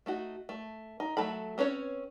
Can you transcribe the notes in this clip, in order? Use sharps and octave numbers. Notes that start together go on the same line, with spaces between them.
A3 D#4 F#4
A3
D#4
F#3 A3 A4 B5
C4 C#4 B4 C#5